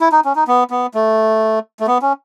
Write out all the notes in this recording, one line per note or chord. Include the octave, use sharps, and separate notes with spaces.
E4
D#4
C#4
D#4
B3
B3
A3
A3
B3
C#4